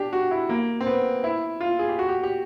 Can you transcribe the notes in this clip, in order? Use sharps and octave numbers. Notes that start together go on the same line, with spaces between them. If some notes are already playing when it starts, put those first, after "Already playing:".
Already playing: D4 G4
F#4
E4
A#3
C4
B3
E4
F4
G#4
G4
F#4
G4
G4